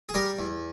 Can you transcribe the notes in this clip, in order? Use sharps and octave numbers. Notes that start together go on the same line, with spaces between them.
G#4
G3 G4 A#4
E2